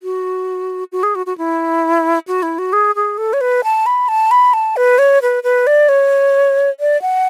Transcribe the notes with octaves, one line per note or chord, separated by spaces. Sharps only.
F#4
F#4
G#4
F#4
F#4
E4
F#4
E4
F#4
G#4
G#4
A4
C#5
B4
A5
B5
A5
B5
A5
B4
C#5
B4
B4
D5
C#5
D5
F#5